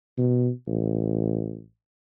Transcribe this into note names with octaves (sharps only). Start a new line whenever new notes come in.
B2
A1